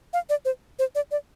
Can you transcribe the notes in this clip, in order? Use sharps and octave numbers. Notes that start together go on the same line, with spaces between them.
F5
D5
C5
C5
D5
D5